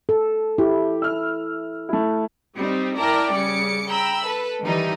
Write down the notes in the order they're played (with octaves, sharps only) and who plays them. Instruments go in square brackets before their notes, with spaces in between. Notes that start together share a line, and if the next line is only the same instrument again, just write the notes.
[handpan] A4
[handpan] E4 [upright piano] G4
[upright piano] E6 F6
A3 E4
[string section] G3 C4 D#4
E4 A#4 D5 G5 A5 A#5
C#3 G3 D6 C#7
G5 A#5 B5 E6
A4 B4
D#3 E3 G3 D#4